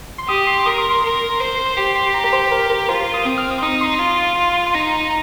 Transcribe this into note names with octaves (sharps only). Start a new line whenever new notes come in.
C6
G4 D#6
C6
A#4 D#6
C6
C6
A#4
C5
G4 C6
C6
C6
A#5
A#4
C5
A#4
A#4
F4 C5
C6
D#6
C4 D#6
F6
D#6
C6
D#4 D#6
C6
F4
F4
C6
D#4 A#5